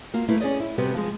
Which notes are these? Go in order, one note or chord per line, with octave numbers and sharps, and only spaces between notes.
A#3 F4 F#4
G3 A3 A#3 E4 B4
C#4 G#4 D5 D#5
E4
C3 G3 B3 F#4 G4 B4
F3 G#3